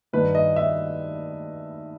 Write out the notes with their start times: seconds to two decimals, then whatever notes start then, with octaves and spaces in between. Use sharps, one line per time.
0.13 G2 D#3 B4
0.35 D#5
0.56 E5